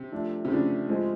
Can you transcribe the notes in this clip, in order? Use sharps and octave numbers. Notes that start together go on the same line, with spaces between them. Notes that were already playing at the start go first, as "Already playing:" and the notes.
Already playing: C3
F3 A3 D4
C3
C#3 F3 A3 D4
F3 G#3 C4 F4 G#4